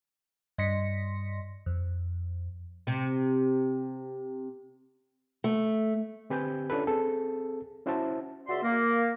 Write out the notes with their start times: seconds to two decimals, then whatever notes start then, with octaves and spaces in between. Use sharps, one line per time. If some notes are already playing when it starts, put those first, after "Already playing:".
0.58 G2 D#5 C6 A#6 B6 C#7
1.66 F2
2.87 C3 C4
5.44 A3
6.30 D3 C4 G4 B4 G#5 G6
6.70 C#4 D4 F4 A4 B4
6.87 C4 G#4 A4 A5
7.86 C#4 E4 F#4 C5 E5 A5
8.48 C#2 F#4 D5 E5 C6
8.63 A#3